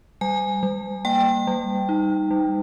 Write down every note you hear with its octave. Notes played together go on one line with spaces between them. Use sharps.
G3 G#5
G3
A#3 G5
G3
D#4
G3